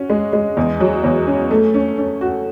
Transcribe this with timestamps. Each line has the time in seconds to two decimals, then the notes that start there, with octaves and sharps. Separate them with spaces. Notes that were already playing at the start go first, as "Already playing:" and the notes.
Already playing: C#4 F#4
0.10 G#3
0.33 G#3
0.57 E2
0.80 F#3
1.04 E2
1.27 C#4
1.51 A3
1.74 C#4
1.98 C#4
2.21 F#4